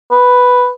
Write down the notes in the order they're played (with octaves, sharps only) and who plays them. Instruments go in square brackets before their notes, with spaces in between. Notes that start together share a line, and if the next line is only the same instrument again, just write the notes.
[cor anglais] B4